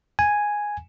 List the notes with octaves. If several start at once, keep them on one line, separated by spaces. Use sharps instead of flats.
G#5